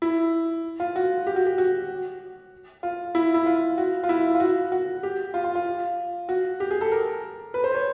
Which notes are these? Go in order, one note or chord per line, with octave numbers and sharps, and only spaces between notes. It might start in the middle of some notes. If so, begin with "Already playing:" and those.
E4
F4
F#4
G4
F#4
G4
F#4
F4
E4
E4
F4
F#4
F4
E4
F4
F#4
F#4
G4
F4
F4
F4
F#4
G4
G#4
A4
A#4
B4
C5
C#5